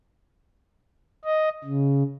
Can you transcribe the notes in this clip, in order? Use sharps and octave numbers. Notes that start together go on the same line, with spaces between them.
D#5
C#3